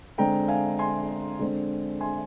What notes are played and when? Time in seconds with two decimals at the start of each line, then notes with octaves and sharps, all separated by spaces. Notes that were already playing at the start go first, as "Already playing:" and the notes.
0.18 D3 G#3 C4 G5 A#5
0.48 F5 G#5
0.79 G#5 C6
1.39 D3 G#3 C4
2.01 G#5 C6